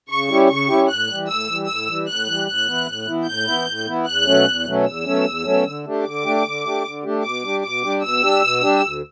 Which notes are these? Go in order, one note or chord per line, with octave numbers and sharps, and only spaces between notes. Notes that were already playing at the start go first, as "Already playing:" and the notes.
C#3 C#6
G3 C#4 E4 G4
C#3 C#6
G3 C#4 E4 G4
A2 F#6
E3 G3
A2 E6
E3 G3
A2 E6
E3 G3
A2 F#6
E3 G3
A2 F#6
E3 B3 E4
A2
E3 B3 E4
A2 G6
E3 B3 E4
A2
E3 B3 E4
E2 F#6
B2 F#3 A3 C#4
E2
B2 F#3 A3 C#4
E2 E6
B2 F#3 A3 C#4
E2
B2 F#3 A3 C#4
D3
A3 D4 G4
D3 D6
A3 D4 G4
D3
A3 D4 G4
D3
A3 D4 G4
B2 D6
G3 D4 G4
B2 D6
G3 D4 G4
B2 E6
G3 D4 G4
B2
G3 D4 G4
D2